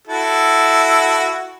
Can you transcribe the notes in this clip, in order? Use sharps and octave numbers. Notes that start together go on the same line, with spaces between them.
E4 F#4 A4